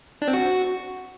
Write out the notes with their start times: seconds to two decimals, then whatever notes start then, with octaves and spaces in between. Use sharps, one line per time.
0.22 D4
0.28 C4
0.33 F#4